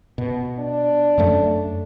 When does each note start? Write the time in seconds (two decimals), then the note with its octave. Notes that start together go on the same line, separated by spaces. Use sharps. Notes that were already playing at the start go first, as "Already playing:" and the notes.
0.18 B2
0.59 D4
1.18 F#2 F#3 A3